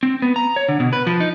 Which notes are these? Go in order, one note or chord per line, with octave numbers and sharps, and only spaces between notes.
C4
B3
A#5
C#5
D3
B2
B4
F3
D#4